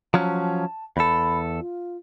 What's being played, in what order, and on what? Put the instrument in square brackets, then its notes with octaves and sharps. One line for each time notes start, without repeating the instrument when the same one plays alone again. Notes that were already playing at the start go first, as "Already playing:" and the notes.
[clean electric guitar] F3 F#3 C#4 [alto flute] A5
[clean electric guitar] E2 A4 [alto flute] B5
[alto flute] F4